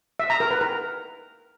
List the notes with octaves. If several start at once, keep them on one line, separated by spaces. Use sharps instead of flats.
E5
A#5
A#4
B4
A#4